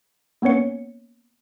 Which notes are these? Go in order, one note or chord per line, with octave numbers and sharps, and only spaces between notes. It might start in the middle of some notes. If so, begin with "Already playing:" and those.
A#3 B3 C#4 C#5 C#7